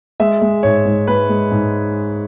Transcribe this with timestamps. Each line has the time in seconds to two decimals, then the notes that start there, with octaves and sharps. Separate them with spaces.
0.20 G#3 E5
0.42 G#3
0.63 G#2 C#5
0.85 G#2
1.07 G#3 B4
1.29 G#3
1.52 G#2